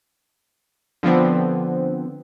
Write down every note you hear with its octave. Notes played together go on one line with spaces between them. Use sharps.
D3 F3 B3 C4